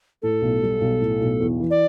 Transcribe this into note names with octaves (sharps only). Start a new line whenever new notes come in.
A2 A4
B1
G3
B1
A2
B1
E2
E3
D5